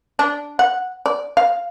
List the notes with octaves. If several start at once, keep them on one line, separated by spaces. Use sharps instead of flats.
D4
F#5
D5
F5